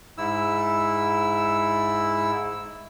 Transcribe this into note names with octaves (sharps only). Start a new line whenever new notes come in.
G#2 E4 E6